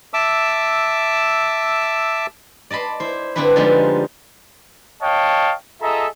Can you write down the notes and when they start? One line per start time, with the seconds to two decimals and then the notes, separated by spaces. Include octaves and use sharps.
0.14 E5 A5 D6 E6
2.70 D5 D#5 A5 B5 C6
3.00 E4 C5
3.36 D3 B3 C4 D4 E4 B4
3.56 D3 F3 G3 G#3 B3 D#4
5.02 C#5 D#5 F5 G5 A5
5.81 F4 G#4 A4 D#5 E5 A#5